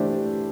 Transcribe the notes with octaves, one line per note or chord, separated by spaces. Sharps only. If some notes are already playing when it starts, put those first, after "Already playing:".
Already playing: E3 A3 D4 G4 C5